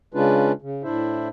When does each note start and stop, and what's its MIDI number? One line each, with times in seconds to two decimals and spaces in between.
0.14 0.52 49
0.14 0.52 56
0.14 0.52 61
0.14 0.52 62
0.14 0.52 65
0.14 0.52 71
0.62 0.83 49
0.84 1.29 45
0.84 1.29 62
0.84 1.29 64
0.84 1.29 72
0.84 1.29 76